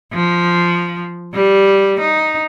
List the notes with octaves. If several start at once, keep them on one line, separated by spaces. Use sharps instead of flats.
F3
G3
D#4